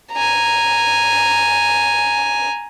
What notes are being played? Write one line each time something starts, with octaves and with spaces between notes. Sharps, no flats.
G#5 A#5